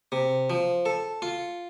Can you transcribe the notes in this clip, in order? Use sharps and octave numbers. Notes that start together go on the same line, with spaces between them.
C3
F3
A4
F4